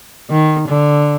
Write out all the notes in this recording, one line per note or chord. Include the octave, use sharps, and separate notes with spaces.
D#3
D3